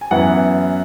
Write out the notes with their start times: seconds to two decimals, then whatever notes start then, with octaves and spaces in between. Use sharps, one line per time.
0.01 G#5
0.11 F#2 E3 B3 E4 F#5